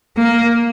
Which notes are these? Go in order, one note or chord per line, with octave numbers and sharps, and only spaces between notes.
A#3